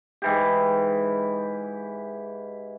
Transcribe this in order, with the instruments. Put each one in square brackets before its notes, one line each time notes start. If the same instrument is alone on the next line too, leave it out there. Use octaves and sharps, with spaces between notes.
[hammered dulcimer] G#2 E3 G4